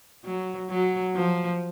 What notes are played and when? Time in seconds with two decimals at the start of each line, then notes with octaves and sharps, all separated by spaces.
0.25 F#3
0.69 F#3
1.15 F3